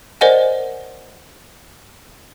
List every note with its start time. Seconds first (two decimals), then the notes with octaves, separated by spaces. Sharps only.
0.21 A#4 C5 D5 D#5 F#5 G#5